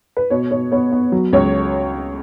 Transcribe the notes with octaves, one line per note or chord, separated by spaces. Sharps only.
B4
B2 C#5
B2 C#5
B3 C#5
B3
F#3
C#2 C#5